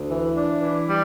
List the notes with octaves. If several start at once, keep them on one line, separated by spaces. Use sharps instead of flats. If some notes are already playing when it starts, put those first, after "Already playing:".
Already playing: D2
E3
D4
E3
G3